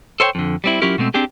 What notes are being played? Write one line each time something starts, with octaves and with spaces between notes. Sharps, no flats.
A4 C5 C#5 F#5 G5
F2 D3
G3 C4 E4
F#3 C#4 E4 F4 G4 A#4
B2 G#3 A3 C4
C4 D4 G4 G#4